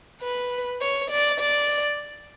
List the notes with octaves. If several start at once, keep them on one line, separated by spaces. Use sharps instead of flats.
B4
C#5
D5
D5